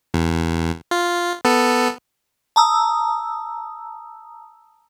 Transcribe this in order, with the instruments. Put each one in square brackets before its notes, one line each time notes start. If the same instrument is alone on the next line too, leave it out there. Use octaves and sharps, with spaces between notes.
[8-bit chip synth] E2
F4
B3 A4
[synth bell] A5 A#5 D#6 E6